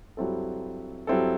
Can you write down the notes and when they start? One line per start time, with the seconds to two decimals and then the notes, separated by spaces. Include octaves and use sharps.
0.17 G2 F#3 C4 E4 A4
1.07 G2 F#3 C4 E4 A4